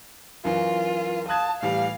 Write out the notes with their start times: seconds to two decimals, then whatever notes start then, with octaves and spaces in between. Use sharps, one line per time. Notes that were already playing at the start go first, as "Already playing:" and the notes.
0.45 F#2 E3 F4 A#4
1.29 F5 A5 D#6 F#6 G#6
1.62 A2 E3 G3 G4 F5